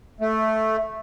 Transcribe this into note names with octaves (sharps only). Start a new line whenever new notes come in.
A3